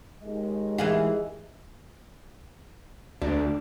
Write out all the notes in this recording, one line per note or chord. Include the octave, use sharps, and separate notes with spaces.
D#2 G#3 D#5
E3 G#4 F5
D2 D4